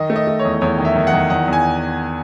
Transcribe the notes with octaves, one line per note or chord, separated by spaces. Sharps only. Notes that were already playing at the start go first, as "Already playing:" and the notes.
Already playing: D#3 D#5
A3
D#5
A3
C#5
E2
E2 C#5
D#3
E5
D#3
F#5
D#3
E2 F#5
E2
G#5